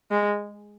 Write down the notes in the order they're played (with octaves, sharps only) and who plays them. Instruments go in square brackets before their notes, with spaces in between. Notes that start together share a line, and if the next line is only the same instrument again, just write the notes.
[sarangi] G#3